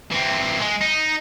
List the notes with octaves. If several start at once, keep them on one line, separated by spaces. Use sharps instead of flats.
E3 C4
G#3
D#4